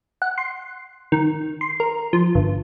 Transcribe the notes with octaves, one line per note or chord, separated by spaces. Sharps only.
F#5
C6
D#3
C6
A#4
F3
G1